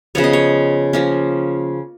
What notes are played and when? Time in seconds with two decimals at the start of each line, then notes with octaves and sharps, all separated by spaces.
0.15 C#3 F3 B3 C#5
0.24 D#5
0.33 C#5
0.93 F3 A#3 C#4